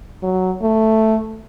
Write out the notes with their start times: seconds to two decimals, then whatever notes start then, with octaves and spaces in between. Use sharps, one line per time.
0.23 F#3
0.62 A3